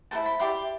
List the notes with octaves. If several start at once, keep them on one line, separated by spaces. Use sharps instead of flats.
E4 A4 C5 A5
B5
E4 G4 D5 C6